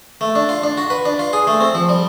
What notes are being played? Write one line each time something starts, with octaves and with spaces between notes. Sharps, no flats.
A3
D4
F4
D4
F#4
B4
D4
F4
G#4
A3
C4
F3
G3